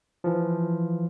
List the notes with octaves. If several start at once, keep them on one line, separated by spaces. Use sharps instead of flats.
E3 F3